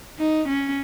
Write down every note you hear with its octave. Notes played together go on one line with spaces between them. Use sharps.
D#4
C#4